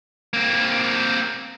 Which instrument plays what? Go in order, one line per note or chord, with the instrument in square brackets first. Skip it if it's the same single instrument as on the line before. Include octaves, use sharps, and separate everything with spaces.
[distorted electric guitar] A#3 C4